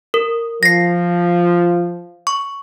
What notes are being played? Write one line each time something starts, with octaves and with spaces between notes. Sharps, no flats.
A#4
F3 A#6 C7
C#6